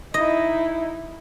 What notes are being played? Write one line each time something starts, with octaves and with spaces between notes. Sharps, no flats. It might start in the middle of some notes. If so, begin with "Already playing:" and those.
D#4 E4 D#5